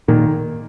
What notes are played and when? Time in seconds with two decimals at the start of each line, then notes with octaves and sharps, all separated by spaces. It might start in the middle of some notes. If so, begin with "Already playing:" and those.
0.08 A#2 D#3